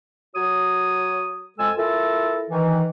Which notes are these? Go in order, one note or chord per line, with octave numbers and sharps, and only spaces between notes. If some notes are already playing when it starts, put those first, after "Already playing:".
F#3 F#4 C#5 D#6
F2 G#3 A4 G#5 E6
E4 F4 A4 A#4
D#3 E3